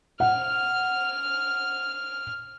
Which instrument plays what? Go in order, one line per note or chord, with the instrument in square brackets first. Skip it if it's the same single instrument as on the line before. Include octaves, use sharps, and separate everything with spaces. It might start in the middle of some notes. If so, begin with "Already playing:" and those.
[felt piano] F#5 [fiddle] F6